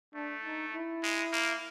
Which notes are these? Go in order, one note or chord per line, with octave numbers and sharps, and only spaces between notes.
A3 D4
D#4
E4
G#3
A#3